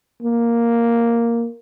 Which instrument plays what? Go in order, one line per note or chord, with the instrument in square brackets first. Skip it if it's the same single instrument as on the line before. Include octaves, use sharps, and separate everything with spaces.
[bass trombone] A#3